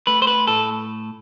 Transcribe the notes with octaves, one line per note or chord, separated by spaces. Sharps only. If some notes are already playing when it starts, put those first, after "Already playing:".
A3 B4
C5
B4
A2 A4